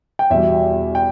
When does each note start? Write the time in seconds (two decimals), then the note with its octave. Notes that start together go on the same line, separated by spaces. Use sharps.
0.19 G5
0.30 E2 B2 G3 E5
0.95 G5